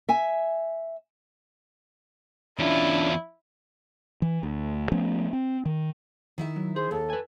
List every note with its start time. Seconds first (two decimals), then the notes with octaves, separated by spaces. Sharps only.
0.09 E5 G#5
2.59 E2 C#4 D4 E4 F4
4.22 E3
4.43 D2
4.92 F3 A3 B3 C#4
5.33 C4
5.66 D#3
6.38 D#3 E4 E5
6.56 F#3
6.76 G#4 C5
6.91 D#2 A4
7.10 B4 G#5